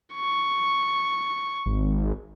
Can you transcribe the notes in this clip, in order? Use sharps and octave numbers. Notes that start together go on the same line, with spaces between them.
C#6
G#1